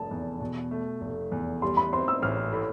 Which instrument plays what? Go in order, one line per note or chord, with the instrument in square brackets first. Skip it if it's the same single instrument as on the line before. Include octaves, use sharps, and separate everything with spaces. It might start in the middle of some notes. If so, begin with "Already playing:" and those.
Already playing: [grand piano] F1 [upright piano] A5
[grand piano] E2
B2
A3
F1
E2
[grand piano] G3 [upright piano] C6
[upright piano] B5
[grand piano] C4 [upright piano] C6
[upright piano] E6
[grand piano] A1 [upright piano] F6
[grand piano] A2